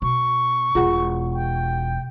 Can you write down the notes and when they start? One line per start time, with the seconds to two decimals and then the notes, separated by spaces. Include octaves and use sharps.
0.02 B2 C#6
0.75 E1 B2 F4 G#4 F#5
1.34 G5